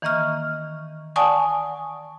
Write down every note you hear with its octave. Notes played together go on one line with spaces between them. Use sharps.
D#3 E3 A#3 D#5 C#6 F6
D5 F#5 G#5 A5 C#6 D#6